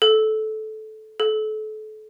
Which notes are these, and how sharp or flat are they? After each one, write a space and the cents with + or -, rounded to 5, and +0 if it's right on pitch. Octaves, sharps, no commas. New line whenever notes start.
A4 -15
A4 -30